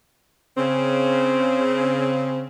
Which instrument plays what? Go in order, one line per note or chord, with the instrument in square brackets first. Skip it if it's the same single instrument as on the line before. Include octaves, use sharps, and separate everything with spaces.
[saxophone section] C#3 C4